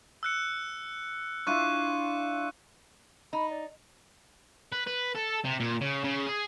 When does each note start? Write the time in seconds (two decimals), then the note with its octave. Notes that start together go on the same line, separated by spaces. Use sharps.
0.23 E6 F#6 C#7
1.47 D4 E4 F4 C#6 F#6 D#7
3.33 D#4 B5
3.50 D5
4.72 B4
4.87 B4
5.15 A4
5.45 C3
5.60 A#2
5.81 C#3
6.04 C#3
6.26 G#4